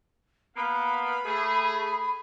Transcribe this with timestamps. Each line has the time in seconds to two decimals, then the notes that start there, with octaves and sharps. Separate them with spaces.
0.56 A#3 B3 F5 B5
1.25 A3 G#4